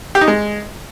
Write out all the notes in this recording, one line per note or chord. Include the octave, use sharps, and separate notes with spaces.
G4
D#4
G#3